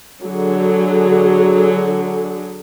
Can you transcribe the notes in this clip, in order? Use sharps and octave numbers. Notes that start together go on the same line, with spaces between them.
D3 F#3 G#4